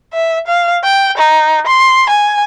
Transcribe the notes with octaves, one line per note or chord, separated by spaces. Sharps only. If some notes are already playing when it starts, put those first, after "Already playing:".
E5
F5
G5
D#4
C6
G#5